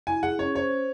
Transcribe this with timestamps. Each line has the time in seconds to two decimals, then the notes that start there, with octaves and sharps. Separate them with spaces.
0.07 E4 G#5
0.23 G#4 F#5
0.39 C#4 C#5
0.55 C5 C#5
0.71 C5